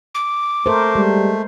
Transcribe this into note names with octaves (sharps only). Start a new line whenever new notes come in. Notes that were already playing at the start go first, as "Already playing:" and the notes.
D6
A3 A#4 C5
G3 G#3